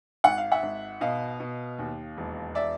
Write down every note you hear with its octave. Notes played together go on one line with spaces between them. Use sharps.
G#1 F#5
F5
E5 F#5
G#1
B2 D#5 F5
B2
D#2
E1
D5 E5